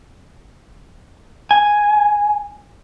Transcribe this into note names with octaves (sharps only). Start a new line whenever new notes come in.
G#5